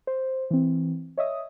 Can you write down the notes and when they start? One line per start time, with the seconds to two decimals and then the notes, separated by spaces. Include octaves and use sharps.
0.07 C5
0.51 E3 C4
1.18 C#5 D#5 E5 D#6